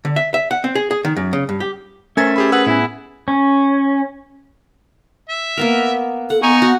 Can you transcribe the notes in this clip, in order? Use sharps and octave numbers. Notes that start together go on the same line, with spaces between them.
D3
E5
E5
F#5
C4
G#4
G#4
D#3
F#2
C#3
G2
G4
A3 C#4 A#4 C5 E5 G#5 G#6 A6
G4 G#4 B5
G#4 B4 F#5 E6
A2 B3 E4 G#5
C#4
E5
A#3 B3 A#4
A4 F#5
B3 D#4 G#5 C#6
F#4